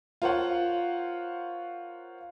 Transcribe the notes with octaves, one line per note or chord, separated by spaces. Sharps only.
F4 A#4 C5 C#5 F#5 C6